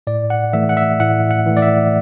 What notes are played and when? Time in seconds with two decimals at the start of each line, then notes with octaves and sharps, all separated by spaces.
0.07 A2 D5
0.30 F#5
0.53 E3 A3 E5
0.69 F#5
0.77 E5
1.00 A2 F#5
1.31 F#5
1.46 E3 A3
1.57 D5
1.62 E5